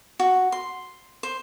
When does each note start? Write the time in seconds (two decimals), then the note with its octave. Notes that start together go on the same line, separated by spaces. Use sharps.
0.19 F#4
0.52 C6
1.23 C5